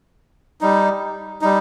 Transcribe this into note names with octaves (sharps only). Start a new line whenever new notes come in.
G3 D#4
G3 D#4